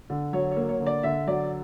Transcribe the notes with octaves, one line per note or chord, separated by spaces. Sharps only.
D3
F#3 C#5
C#5
A#3
C#5
D3
D5
D3 E5
F#3 D5